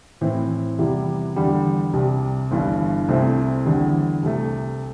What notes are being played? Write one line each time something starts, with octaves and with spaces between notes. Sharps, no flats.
A2 E3 C4 E4
E2 C3 G3 E4
E2 D3 G3
C2 C3 G3
G1 G2 E3
C2 C3 A3 C4 E4
E2 D3 G3 E4
C2 C3 A3